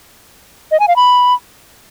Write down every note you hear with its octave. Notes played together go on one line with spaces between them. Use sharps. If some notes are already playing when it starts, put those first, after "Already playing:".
D#5
G#5
F5
B5